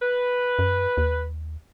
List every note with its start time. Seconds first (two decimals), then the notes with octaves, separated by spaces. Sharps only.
0.02 B4
0.59 F#2
0.97 D#2